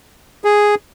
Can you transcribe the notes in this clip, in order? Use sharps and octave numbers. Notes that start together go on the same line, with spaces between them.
G#4